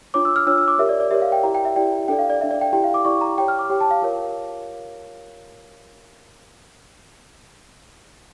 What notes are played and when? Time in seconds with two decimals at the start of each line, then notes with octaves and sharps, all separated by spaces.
0.14 D4 F4 C#5 D6
0.25 E6
0.36 F6
0.47 D4 F4 C#5 E6
0.58 E6
0.68 D6
0.79 G4 A#4 C#5 E5
0.89 D5
1.00 D5
1.11 G4 A#4 C#5 E5
1.22 F5
1.32 G5
1.43 E4 G4 D5 A#5
1.55 G5
1.65 E5
1.76 E4 G4 D5 G5
2.08 D4 A4 D5 G5
2.19 F5
2.30 D5
2.40 D4 A4 D5 E5
2.51 D5
2.61 G5
2.73 E4 G4 D5 G5
2.84 F5
2.94 D6
3.05 E4 G4 D5 C#6
3.21 A#5
3.38 G4 C#5 G5
3.48 F6
3.59 D6
3.70 G4 C#5 G5
3.81 A5
3.91 F5
4.02 F4 A#4 C#5